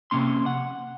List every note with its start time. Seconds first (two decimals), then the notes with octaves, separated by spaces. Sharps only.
0.11 C3 A#3 C#4 C6
0.46 F#5